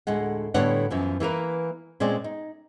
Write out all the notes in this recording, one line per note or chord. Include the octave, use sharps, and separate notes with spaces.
D2 A2 G#3 F#5
A2 D3 G3 B3 C#5 F#5
F#2 E3 F3
E3 A#3 A#4 B4
A#2 G#3 C4 C#4 D5
D#4